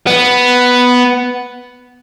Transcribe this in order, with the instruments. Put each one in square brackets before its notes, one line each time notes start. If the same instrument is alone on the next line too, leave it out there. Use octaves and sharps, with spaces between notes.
[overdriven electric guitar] B3